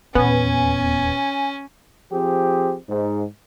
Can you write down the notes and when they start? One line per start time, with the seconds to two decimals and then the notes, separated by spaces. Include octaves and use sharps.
0.15 D#1 E2 B3 C#4 G#5
2.12 F3 C4 G4 G#4
2.89 G#2